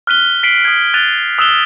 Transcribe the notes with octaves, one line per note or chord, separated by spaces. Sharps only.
F6 F#6 B6 D#7 G7
B6 C7 D7 D#7 F#7
D#6 F#6 G#6
F#6 A6 D#7 F7 G7
D#6 E6 F#6 E7 F7 G7